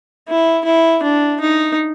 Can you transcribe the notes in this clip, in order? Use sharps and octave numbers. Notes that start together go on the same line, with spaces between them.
E4
E4
D4
D#4